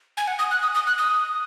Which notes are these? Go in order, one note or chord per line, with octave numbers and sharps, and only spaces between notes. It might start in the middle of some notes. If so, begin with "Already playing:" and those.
G#5
F#5
D#6
F#6
D#6
D#6
F#6
D#6